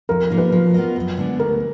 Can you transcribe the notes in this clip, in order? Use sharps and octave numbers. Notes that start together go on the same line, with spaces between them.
F2 A#4
F3 A#3 D#4 A#4
B4
F3
B3 F4 A#4 D#5
F#2
D3 G#3 B3 D4
D2 A#4